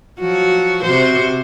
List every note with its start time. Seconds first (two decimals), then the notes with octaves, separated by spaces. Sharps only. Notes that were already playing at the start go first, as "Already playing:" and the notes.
0.20 F3 F#3 F#4
0.84 C3 F#4 C5